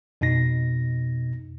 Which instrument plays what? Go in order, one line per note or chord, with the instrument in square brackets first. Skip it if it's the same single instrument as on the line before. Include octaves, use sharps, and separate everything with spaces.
[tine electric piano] F2 B2 D#4 A#6